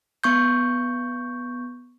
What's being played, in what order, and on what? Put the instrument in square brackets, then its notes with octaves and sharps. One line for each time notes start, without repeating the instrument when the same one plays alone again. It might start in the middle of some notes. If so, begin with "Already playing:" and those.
[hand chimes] B3 C#6 G6